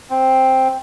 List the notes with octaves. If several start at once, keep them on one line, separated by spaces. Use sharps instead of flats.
C4